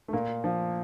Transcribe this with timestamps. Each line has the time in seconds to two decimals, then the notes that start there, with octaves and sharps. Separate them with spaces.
0.08 A3
0.13 A#2 A#3
0.44 F3